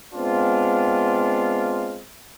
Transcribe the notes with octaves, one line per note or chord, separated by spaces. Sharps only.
G#3 B3 C4 D4 F4